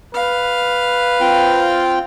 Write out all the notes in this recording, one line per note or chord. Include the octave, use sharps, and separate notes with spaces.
B4 F5
C4 F4 G5